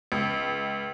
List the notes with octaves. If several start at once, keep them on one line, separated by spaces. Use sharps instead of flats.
C#2